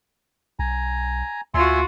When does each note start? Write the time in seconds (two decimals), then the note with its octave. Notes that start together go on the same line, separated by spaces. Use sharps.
0.59 B1 G#5 A#5
1.54 D2 F4 F#4 E5 G#5 C6